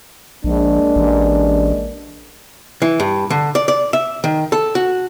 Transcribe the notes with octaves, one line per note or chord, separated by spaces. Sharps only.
A#1 G#3 A#3 D4
A1
E3
G2
D3
D5
D5
E5
D#3
A4
F#4